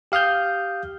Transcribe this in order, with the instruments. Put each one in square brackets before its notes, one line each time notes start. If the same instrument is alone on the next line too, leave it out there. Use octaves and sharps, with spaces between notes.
[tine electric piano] G4 F5 D#6 F6 G6